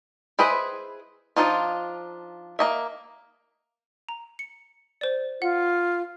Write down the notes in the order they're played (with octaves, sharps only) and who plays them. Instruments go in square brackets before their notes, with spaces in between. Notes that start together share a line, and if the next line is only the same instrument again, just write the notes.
[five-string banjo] E4 G#4 B4 C5 D#5
F3 A#3 D4 D#4 F4
A#3 D#5 E5
[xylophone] A#5
C#7
C5 D5
[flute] F4 [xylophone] F#5